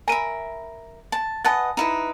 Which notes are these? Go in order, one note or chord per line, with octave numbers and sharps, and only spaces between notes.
A#4 E5 G#5 B5 D#7
A5
B4 D#5 F#5 G#5 A5 A6
D#4 E4 B4